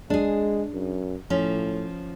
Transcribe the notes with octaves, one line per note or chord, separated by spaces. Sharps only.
G#3 D4 G#4
F#2
A2 F3 C#4